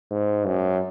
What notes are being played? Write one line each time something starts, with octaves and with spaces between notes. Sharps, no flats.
G#2
F#2